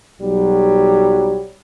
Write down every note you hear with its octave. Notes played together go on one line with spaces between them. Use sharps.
B1 F#3 G3